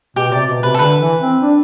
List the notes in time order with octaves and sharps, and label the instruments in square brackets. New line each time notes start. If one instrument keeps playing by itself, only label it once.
[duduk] B2 [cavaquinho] G4
[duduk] C3 [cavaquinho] D5
[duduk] B2
[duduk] C3 [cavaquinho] B4
[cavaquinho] A4
[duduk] D3 [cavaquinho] B4
[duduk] E3
C4
D4